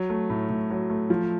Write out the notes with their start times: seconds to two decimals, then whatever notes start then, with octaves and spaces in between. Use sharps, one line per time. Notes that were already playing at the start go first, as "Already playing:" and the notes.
Already playing: F#3
0.10 A3
0.30 A2
0.49 A2
0.70 F#3
0.90 A3
1.10 F3